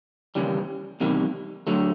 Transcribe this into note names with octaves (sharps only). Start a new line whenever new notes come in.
D#2 C#3 E3 G3
E2 C3 D#3 G3 A#3
D3 F#3 A3